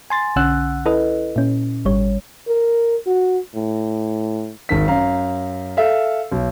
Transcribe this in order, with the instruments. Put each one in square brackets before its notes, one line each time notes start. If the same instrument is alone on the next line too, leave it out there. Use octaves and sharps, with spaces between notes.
[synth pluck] G#5 C6 A6
B1 D3 C#4 F#5 E6 F#6
E4 A4 B4 D#5
A#2 C#4
G#1 G3 C#5
[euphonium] A#4
F#4
A2
[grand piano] G#1 D#3 B6
F#2 F5 A#5
A4 E5 F5
B1